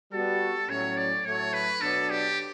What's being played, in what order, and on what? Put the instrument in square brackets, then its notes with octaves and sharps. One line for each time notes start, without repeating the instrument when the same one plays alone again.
[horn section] G3 B3 F#4 [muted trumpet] A4
[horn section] A2 F#3 C#4 [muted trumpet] C#5
[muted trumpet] D5
[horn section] A2 F#3 A3 [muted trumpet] C#5
[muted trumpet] B4
[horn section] B2 F#3 B3 D4 [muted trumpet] A4
[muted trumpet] G4